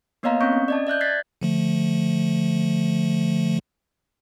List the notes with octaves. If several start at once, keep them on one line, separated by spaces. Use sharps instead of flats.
A#3 B3 C#5 D#5 F5 A#5
C4 C#4 C#6 G6
C#4
D5 D#5 A5
D5 E5 F#6 G6
F#6 G#6 A6 B6 C7
D3 F3 A3